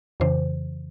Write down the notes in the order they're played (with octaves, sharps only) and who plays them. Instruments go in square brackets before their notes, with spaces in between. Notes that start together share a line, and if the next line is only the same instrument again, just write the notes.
[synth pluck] F2 C#3 E3 C5